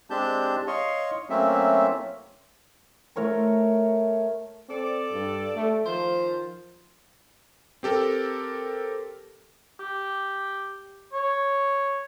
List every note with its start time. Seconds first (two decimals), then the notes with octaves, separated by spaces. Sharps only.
0.10 G#3 C4 D4 G4 A5 G6
0.67 C#5 D#5 F5 C6 C#6
1.30 F#3 A3 A#3 C4 C#4 E5
3.16 A3 A#4 C#5 A#5
4.69 C4 A4 D5
5.12 G2
5.56 A3
5.85 D#3 F3 F4 C5
7.83 C4 G4 A4 A#4
9.80 G4
11.13 C#5